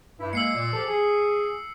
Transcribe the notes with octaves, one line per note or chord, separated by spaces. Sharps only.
G2 E4
G#3 A#3 E6 C7 C#7
A#2
F3 G4 A4
G#4